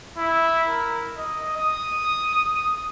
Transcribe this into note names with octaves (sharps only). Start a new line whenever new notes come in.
E4
A#4
D#5
D#6